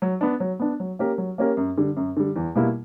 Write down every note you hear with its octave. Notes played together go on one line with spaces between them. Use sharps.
F#3
B3 D4
F#3
B3 D4
F#3
A#3 C#4 G4 A#4
F#3
A#3 C#4 G4 A#4
F#2
D3 G3
F#2
D3 G3
E2
B2 G3 A#3 E4